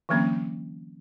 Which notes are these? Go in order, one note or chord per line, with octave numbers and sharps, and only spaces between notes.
D3 E3 F#3 A#3 C4 C#4